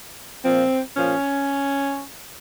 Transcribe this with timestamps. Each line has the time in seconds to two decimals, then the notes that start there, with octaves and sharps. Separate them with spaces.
0.43 A#2 F3 C4
0.95 A#2 F3 C#4